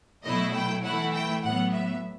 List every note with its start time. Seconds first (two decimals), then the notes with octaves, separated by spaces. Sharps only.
0.23 B2 F#3 A3 E4 D#5
0.53 G5
0.83 E3 A3 E4 F#5
1.14 G5
1.42 A2 F#3 B3 F#5
1.73 E5